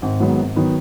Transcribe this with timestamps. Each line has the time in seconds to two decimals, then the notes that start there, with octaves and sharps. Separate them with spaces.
0.02 G#1
0.20 G#2 D#3 F#3 B3
0.39 G#1
0.56 D#3 F#3 B3